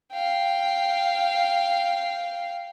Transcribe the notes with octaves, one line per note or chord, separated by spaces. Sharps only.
F5 G5